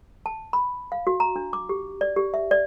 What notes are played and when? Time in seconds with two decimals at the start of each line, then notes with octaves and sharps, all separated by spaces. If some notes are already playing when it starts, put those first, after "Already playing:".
0.26 A5
0.53 B5
0.92 F5
1.07 F#4
1.20 A#5
1.36 D4
1.53 D6
1.69 G4
2.01 D5
2.16 G4
2.34 E5
2.51 D5